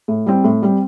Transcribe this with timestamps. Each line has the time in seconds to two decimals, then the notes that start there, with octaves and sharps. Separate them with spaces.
0.08 A2
0.26 G3 C4
0.44 A2
0.62 G3 C4